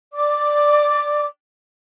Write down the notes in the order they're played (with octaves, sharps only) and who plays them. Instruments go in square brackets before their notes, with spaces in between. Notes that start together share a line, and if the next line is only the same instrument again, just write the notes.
[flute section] D5 D6